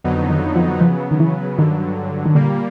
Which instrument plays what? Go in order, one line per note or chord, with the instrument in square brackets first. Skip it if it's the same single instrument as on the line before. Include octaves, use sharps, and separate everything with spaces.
[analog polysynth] F2 D3 F#3 B3 D#4
[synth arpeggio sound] D#3
F3
[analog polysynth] C#3 F#3 B3 [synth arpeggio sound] F3
[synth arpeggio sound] D#3
E3
[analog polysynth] G2 D3 F#3 [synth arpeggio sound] D#3
[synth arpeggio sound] D#3
[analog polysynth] A#2 G3 A#3 [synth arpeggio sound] D3